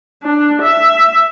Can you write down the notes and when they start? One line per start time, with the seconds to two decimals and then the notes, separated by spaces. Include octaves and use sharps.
0.23 D4
0.62 E5